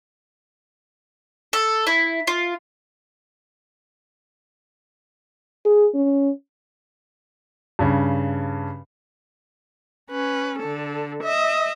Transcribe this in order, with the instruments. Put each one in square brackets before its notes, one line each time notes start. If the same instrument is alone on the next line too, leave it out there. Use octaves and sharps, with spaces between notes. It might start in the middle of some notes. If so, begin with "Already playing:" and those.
[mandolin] A4
E4
F4
[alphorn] G#4
C#4
[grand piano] G2 C#3
[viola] C#4 B4
D3 A4
D#5 E5